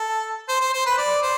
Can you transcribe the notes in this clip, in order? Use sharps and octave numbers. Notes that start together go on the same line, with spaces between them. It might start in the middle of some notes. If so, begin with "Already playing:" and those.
Already playing: A4
C5
C5
C5
B4
D5
C5